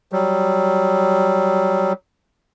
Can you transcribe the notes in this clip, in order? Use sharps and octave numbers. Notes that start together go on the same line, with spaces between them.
F#3 G3